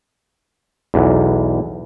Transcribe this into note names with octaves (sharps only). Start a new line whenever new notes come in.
B1 E2